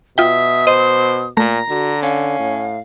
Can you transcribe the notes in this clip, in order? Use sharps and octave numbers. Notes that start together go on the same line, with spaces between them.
B2 F4 E5 G5 D#6
C5 D#5
A#2 A3 A#5
D3 F#4
C#4 F5
A2